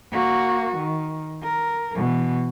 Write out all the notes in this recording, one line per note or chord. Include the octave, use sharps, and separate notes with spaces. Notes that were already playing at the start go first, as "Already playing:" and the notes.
A#3 F#4
D#3
A#4
B2 E3